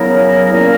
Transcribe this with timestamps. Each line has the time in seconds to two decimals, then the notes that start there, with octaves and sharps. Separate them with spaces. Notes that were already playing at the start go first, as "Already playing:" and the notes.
Already playing: C#3 F#3 B3 E4 A#4
0.51 A#2 A#3 C#4 E4 A#4